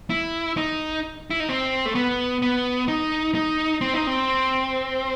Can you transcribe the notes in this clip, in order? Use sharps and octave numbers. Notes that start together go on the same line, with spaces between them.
E4
D#4
E4
D#4
C4
A3
B3
B3
D#4
D#4
C4
D#4
C4